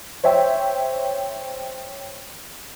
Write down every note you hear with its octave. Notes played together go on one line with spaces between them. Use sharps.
C5 C#5 E5 G5